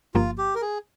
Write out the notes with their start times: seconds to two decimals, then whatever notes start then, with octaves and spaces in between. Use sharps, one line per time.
0.14 G1 G2 F3 A#3 F4
0.38 G4
0.55 A#4
0.62 G#4